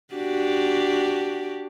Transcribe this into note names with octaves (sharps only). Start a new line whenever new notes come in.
D4 F#4 G4